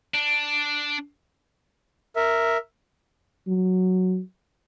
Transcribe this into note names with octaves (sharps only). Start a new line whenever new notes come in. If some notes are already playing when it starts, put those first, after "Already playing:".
D4
A#4 E5
F#3